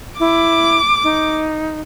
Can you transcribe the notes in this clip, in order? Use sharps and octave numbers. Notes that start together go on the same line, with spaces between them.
E4 D6
D#4